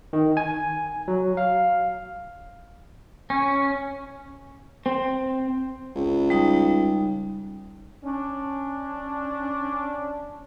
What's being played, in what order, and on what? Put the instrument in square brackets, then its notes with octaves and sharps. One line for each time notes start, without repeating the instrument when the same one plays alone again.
[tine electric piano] D#3
G#5
F#3
F5
[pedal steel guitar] C#4
[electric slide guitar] C4
[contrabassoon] C#2
[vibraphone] G3 D#4
[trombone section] C#4 D4